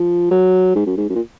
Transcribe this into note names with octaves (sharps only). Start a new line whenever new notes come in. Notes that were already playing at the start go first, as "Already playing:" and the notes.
Already playing: F3
F#3
G#2
F#2
G#2
F#2
A#2